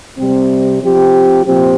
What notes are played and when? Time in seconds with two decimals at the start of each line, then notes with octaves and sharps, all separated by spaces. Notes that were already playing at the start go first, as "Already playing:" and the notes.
0.17 C3 G3 C4
0.81 F3 C4 G4
1.45 A#2 F3 C4 G4